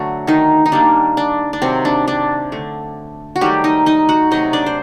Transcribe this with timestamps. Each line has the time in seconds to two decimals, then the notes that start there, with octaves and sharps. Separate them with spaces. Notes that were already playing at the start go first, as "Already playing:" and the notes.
Already playing: D3 F#3 A3 F#4
0.27 D#3 D#4
0.66 D#4
0.72 D#3 G3 A#3 D4
1.17 D4
1.53 D4
1.62 C3 D#3 F#3 C4
1.85 D4
2.08 D4
2.52 D3 A3
3.36 F#4
3.41 D#3 F#3 G3 A3 G4
3.64 D#4 D#5
3.86 D#4 D#5
4.09 F#4 F#5
4.31 C3 F#3 A3 D#4 D#5
4.53 D4 D5
4.66 C5